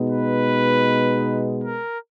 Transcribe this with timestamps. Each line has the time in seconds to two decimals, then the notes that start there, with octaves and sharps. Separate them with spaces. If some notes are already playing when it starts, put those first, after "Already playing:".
Already playing: B2 G#3 B3 D#4
0.10 B4
1.64 A#4